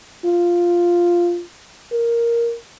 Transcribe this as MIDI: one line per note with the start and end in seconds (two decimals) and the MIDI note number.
0.24 1.43 65
1.92 2.56 70